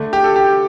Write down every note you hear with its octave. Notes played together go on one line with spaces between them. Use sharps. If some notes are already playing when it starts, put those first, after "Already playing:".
Already playing: D3 A3 D4
G4
A4
G4